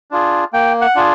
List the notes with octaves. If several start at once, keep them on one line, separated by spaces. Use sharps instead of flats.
D4 F4 G#4
A#3 G5
F#5
D4 F4 G#4